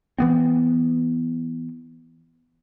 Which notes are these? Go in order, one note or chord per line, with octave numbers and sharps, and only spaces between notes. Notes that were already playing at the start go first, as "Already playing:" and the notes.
E3 B3 C4